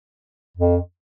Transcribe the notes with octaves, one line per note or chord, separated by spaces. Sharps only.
F2